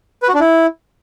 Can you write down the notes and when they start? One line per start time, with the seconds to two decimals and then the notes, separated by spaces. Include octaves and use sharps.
0.23 B4
0.28 F#4
0.34 D4
0.40 E4